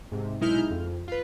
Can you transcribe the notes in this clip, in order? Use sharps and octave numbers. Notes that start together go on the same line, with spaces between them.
G#2 C3
B1 G#3 D#4 E4 F6 G6
F2
F4 B4